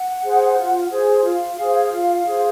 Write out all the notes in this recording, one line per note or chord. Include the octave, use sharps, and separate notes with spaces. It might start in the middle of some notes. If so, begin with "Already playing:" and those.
Already playing: F#5
G#4 C5
F4
G#4 C5
F4 F5
G#4 C5
F4
G#4 C5